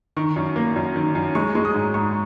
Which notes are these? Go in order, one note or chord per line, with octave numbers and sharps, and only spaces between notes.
D#3 C#6
F#2
A#3
F#2
D#3
F#2
G#3 C#6
G#3
D#6
G#2
G#2 C#6